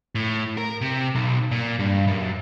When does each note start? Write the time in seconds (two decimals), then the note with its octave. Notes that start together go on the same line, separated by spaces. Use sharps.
0.15 A2
0.57 A#4
0.81 C3
1.15 B1
1.51 A#2
1.79 G2
2.07 F#2